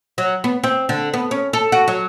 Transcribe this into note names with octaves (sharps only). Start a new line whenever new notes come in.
F#3
B3
C4
D3
B3
C#4
A4
F#4
F#3